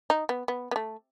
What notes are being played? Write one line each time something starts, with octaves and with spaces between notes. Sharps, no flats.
D#4
B3
B3
B3
A3